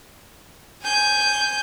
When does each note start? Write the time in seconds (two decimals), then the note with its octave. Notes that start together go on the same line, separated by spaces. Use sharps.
0.82 G#5 G6